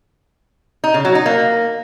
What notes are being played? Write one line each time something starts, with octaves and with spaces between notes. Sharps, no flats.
D#4
C#3
F#3
D#4
A#3